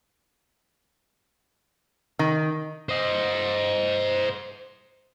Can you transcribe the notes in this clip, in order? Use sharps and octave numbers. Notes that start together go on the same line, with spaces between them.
D#3
C5 D#5